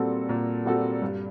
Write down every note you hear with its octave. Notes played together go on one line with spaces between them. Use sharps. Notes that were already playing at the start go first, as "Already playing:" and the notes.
Already playing: A#2 G3 C4 F#4 A4
A#2
G3 C4 F#4 A4
G2